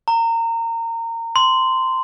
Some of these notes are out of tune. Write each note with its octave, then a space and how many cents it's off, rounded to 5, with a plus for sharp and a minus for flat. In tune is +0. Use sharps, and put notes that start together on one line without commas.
A#5 -25
C6 -10